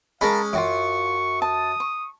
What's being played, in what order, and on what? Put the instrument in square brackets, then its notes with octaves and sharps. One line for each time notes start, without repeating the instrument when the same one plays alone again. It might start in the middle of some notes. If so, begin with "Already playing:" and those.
[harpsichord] G#3 C#4 [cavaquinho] A#4 A5 B5 [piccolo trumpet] F5
[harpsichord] F#2 [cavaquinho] F4 F#4 D6 [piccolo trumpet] C#6
[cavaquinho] A5 [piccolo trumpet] D#6
[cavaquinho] C#6